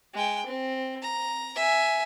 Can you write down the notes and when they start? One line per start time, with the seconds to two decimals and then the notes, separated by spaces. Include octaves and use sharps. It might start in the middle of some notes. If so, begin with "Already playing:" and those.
0.14 G#3 G5
0.46 C4
1.02 A#5
1.56 E5 G#5